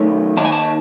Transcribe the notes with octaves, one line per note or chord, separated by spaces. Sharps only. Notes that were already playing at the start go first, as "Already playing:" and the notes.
Already playing: F#2 D#3 A3 C#4
D#2 D#3 A5
G#5
A5